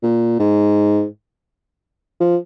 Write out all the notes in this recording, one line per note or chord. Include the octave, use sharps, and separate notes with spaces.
A#2
G#2
F3